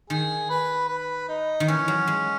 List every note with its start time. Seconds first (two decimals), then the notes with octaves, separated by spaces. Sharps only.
0.10 D#3 G#4
0.50 B4
0.88 B4
1.28 D#4
1.60 D#3
1.68 E3 C#4
1.88 F#3
2.07 G#3